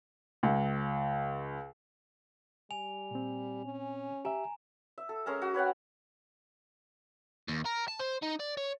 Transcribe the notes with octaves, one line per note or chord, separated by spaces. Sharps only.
C#2
G3 G#5 F7
A#2 C4
C#4
G4 E5 G#5 A#5
E5
A4
G#3 C#4 A#4 A#5
F#4
B4 C#5 F#5 G5
D#2
A#4
A5
C5
D#4
D5
C#5